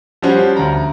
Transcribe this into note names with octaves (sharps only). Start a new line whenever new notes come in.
F3 G3 C#4 F#4 C5
D2 A#5